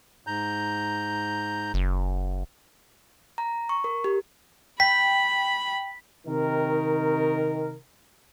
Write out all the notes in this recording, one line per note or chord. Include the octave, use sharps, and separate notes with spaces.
G#2 A#5 G6
F#1
A#5
C#6
A#4
G4
G5 B5 B6
C3 D#3 A#4